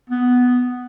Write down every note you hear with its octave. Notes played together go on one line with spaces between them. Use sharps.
B3